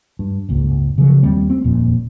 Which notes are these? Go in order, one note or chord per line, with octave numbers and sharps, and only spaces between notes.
G2
F#1 C#2 G#2
C#3 F3 F#3
D#2 G3 A3 C4
C4 C#4
D#1 F2 A#2